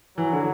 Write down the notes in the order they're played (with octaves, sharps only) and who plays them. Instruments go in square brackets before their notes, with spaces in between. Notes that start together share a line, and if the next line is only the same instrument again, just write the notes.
[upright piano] E3 [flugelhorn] F#3
[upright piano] D3